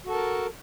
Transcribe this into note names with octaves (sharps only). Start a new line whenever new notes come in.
F#4 A4 A#4 A5